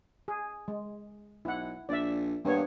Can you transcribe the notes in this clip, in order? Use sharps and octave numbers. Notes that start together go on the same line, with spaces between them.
G#4
G#3
B1 E4 F#5
A#1 D5 E5
G2 A#3 B3 C#5